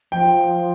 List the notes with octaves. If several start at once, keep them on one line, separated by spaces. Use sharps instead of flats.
F3 G5